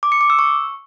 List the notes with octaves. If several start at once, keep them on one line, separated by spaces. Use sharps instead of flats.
D6
C#7
D6
E6
C#6